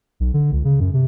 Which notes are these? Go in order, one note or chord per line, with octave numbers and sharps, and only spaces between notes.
B1
D3
C#2
C#3
F#2
C3